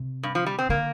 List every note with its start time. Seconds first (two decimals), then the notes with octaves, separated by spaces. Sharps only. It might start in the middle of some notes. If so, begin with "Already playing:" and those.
Already playing: C3
0.23 G2
0.35 F3
0.46 G3
0.59 C4
0.69 D3 A#3